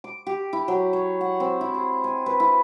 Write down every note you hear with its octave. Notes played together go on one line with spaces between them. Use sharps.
D6
G4
E4
F#3
C#5
F#5
C4
E4
G#4
G#5
B4
E4